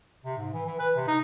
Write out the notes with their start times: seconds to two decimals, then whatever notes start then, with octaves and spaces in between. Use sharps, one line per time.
0.25 C3
0.38 G#2
0.54 E3
0.66 E3
0.79 B4
0.95 C3
1.08 D#4